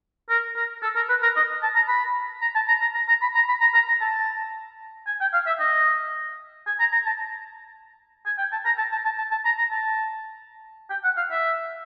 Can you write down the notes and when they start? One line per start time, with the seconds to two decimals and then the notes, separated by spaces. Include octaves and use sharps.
0.29 A#4
0.56 A#4
0.82 A4
0.96 A#4
1.09 B4
1.23 A#4
1.36 D#5
1.62 A5
1.75 A#5
1.88 B5
2.41 A#5
2.55 A5
2.68 A#5
2.81 A#5
2.94 A#5
3.08 A#5
3.22 B5
3.35 A#5
3.48 B5
3.60 A#5
3.74 A#5
3.88 A#5
4.01 A5
5.06 G#5
5.21 G5
5.33 F5
5.46 E5
5.59 D#5
6.67 G#5
6.79 A#5
6.92 A#5
7.06 A5
8.26 G#5
8.38 G5
8.52 A5
8.65 A#5
8.78 A5
8.92 A5
9.05 A5
9.18 A5
9.31 A5
9.45 A#5
9.58 A#5
9.71 A5
10.90 G5
11.04 F#5
11.17 F5
11.31 E5